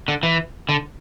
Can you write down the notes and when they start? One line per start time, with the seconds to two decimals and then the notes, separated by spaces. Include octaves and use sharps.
0.08 D3
0.23 E3
0.69 D3